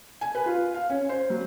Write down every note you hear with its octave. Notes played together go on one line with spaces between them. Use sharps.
G#5
B4
F4
F5
C#4
C5
F#3